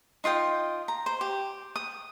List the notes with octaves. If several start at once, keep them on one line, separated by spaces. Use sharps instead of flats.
D#4 F4 D#5 G5
A#5
C5
G4
D#6